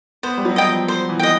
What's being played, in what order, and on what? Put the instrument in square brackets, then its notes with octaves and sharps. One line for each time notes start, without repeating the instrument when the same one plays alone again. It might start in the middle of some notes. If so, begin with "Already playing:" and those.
[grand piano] B3 [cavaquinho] C5
[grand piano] G3
F#3
[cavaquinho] D#5 G5
[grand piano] F3
[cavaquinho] C5
[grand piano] E3
[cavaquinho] D#5 G5